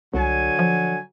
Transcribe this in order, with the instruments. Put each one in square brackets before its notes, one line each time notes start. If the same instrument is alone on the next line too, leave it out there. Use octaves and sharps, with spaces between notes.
[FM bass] C2 [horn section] D3 F#3 G#5
[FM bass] F3